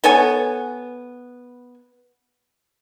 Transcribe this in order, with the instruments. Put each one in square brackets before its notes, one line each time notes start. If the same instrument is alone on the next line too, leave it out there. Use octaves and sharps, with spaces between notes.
[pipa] B3 A4 C#5 G#5